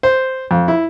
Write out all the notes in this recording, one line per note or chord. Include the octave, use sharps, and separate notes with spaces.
C5
F2
E4